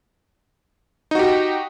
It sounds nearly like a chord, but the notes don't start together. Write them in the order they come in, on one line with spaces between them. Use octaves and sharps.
D#4 F#4 G4